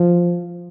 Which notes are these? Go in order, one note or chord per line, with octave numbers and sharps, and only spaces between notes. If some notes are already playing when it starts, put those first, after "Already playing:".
Already playing: F3